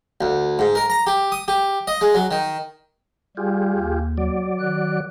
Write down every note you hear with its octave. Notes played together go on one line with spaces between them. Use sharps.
D2
G#2
A#4
A#5
G4
D#6
G4
D#5
G#3
F#3
D#3
G3 F4 G4 G#4
D#2
F#3 D5
D#3 F#6